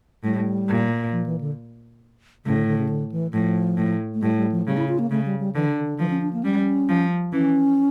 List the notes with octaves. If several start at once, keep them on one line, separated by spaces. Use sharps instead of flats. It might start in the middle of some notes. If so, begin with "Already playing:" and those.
A2 G3
A#2
F3
E3
D3
A2 C#3
D3
D3
C#3
D3
E3
A2 F3
A2
A3
A2 G3
G3
F3
C#3 G3
E4
F4
A#3
C#3 A3
G3
G3
D3 E3
D3
D3
E3 F3
C#4
D4
A#3
G3 C#4
F3
E3 C#4